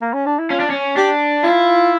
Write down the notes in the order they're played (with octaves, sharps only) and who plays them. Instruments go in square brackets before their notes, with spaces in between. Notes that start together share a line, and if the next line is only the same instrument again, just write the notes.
[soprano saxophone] A#3
C#4
D4
E4
[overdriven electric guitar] C#4 [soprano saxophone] F4
[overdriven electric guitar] D4
C#4
[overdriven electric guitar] D4 [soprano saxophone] G4
[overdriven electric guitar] E4 [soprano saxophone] F4